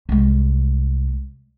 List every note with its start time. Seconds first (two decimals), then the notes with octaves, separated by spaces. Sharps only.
0.09 C2 G#3